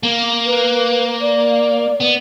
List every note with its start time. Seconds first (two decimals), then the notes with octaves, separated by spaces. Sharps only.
0.03 A#3
0.46 B4
1.21 D5
2.00 B3